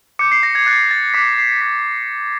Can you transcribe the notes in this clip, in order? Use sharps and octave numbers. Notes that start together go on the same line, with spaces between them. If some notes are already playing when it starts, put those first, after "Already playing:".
D6 G6 C#7
C7
A#6
G#6
D6 F#6 A6
A6
D6 F#6 B6
C7
C7
C#6 F#6 B6